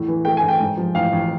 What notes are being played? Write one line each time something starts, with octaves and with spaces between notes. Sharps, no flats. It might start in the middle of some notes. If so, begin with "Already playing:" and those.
Already playing: E2 A2
E3
A3 G5
G#5
A1
G5
G#2
F3
A1 F5
A1